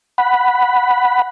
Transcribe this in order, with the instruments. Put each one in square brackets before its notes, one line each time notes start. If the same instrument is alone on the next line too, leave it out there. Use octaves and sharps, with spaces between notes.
[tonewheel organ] F#5 B5